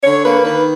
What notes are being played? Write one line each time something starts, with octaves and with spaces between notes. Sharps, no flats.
D3 C#5
A#3 B4
D#3 B4